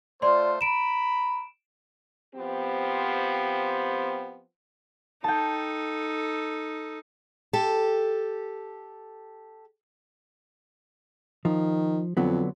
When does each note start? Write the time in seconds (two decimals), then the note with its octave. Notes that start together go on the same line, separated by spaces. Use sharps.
0.22 A3 F4 C5 D5 C6
0.61 A#5 B5 D7 E7
2.35 F3 B3 C4 G4
5.24 D#4 A4 G5 A5
7.53 G4 A4
11.45 D#3 F3
12.17 F2 D3 F#3 B3